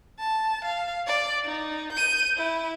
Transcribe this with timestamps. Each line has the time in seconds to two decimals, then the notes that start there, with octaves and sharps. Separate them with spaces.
0.19 A5
0.65 F5
1.07 D5
1.45 D#4
1.93 G6 D#7
2.37 E4